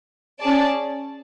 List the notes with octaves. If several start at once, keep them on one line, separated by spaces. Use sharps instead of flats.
C#4 G#4 D5 A5